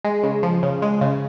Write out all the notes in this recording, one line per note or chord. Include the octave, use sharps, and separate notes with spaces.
G#3
C#3
F3
C#3
G#3
C#3